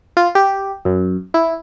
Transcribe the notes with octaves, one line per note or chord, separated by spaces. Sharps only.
F4
G4
F#2
E4